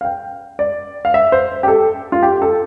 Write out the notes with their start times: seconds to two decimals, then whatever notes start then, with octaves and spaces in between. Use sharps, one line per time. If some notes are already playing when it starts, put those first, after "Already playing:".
0.01 F5
0.05 G5
0.59 D5
1.05 F5
1.14 E5
1.32 C5
1.63 G4
1.68 A4
2.12 F4
2.23 G4
2.42 A4